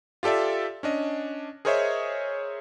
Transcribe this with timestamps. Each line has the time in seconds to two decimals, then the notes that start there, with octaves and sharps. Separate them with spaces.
0.23 F4 G4 A4 D5 E5
0.83 C#4 D4 D#5
1.65 G#4 A#4 C5 C#5 D#5 E5